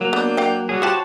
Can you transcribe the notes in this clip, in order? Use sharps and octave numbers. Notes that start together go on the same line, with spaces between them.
F#3 A#3
B3 D4 G6
F5 G5
G3 F#4 G#4 C#5
F4 G4 C5 F#5 A5